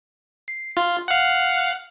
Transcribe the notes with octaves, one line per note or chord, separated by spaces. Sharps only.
C7
F4
F5 F#5